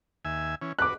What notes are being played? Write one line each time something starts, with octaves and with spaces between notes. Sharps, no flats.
D#2 E5 G#5
E3 C#4
F#4 B4 D6 F#6